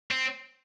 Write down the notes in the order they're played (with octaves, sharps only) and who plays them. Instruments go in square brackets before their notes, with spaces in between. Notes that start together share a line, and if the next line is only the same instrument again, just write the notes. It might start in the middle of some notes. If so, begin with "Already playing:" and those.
[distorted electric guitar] C4